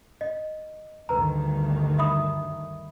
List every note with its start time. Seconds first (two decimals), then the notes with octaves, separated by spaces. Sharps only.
0.21 D#5
1.09 D2 G2 D#3 B4 A#5
1.99 E5 B5 D#6